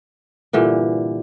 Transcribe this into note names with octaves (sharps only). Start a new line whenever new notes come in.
G2 A#2 D3 E3